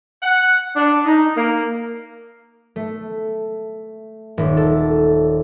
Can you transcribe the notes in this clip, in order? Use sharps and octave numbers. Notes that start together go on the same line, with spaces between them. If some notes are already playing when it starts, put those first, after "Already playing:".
F#5
D4
D#4
A#3
A3
D#1
A4